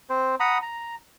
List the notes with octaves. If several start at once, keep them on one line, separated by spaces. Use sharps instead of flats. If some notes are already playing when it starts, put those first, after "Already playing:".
C4 C5
F#5 A#5 B5 D#6
A#5